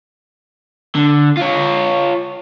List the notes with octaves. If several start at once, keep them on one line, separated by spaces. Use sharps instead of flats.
D3
F4 C#5